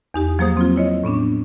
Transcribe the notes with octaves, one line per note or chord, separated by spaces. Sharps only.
E2 D#4 G4
F3 F#3 A#3 G#4 C5 D#6
C4 F4
E4 C#5 D#5
A2 B3 C#4 D4